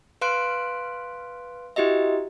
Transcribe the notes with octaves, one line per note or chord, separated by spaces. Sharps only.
B4 F5 C6 F#6 D7
E4 F#4 G4 D#5 E5